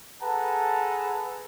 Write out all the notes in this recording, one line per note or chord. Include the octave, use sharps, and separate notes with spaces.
G#4 A4 B4 F#5 A5 A#5